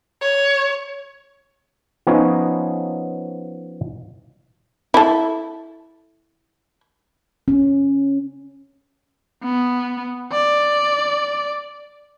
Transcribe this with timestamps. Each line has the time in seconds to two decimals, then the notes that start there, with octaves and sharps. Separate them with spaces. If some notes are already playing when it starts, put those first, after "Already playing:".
0.22 C#5
2.07 F3 B3 C#4 D#4 C#5 D#5
4.94 E4 A4
7.48 C#4
9.44 B3
10.32 D5